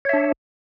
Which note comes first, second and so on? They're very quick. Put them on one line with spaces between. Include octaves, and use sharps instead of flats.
C#5 E5 D4